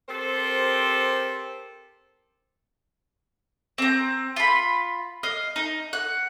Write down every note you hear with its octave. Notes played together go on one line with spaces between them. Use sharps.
C4 G4 A4 A#4 C5
C4 A#5
F4 B5
D#5 F5
D#4
F#5